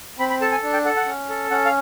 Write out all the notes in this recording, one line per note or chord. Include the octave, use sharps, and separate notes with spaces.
C4 B5
B5
A4 A5
G#5
D4
G5
A4 F#5
F#5
C#4
A4
C#4 F#5
F5